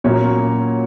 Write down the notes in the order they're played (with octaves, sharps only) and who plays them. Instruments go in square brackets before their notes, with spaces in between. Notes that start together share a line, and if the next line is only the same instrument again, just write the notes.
[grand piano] A#2 F#3 A#3 C#4 C#5